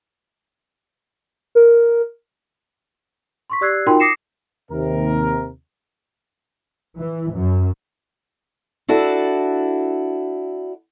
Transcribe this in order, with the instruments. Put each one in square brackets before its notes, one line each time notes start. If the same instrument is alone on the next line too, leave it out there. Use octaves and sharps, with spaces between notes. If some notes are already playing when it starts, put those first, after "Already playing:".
[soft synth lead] A#4
[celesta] C6 C#6 B6
G4 D5 E6 F#6 G#6 C7
D#4 F4 F#4 A#4 G5 C6
D6 D#6 A#6 C7 C#7 E7
[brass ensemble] D#2 C3 A#4
[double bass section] E3
F#2
[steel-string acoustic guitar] D4 E4 F#4 A4